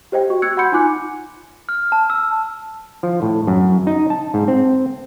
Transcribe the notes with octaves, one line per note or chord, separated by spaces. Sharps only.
G4 C5 D#5 G5
F#4 C#6
E6 F#6 G#6 C#7
F#5 B5 C6 G6 C#7
D#4 F4 G#5 D6 F#6
F6
A5
E6
F3
A2
F#2
D#4
A5
G#2
C4